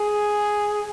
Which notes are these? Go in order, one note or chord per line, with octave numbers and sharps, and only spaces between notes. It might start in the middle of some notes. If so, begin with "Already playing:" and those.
Already playing: G#4